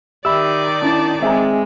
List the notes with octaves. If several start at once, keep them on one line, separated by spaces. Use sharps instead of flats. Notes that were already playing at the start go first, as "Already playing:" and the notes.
D#3 G4 D5 E5 B5 E6
C#4 D4 E4 A5 D6 A6
G#3 C4 G#4 E5 G#5 A#5